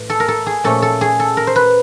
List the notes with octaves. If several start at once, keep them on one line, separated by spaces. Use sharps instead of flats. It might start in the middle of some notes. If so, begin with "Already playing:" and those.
Already playing: A2 E3
A4
A#4
A4
G#4
A#2 F3 A3 C#4 A4
A4
G#4
A4
A#4
C5
B4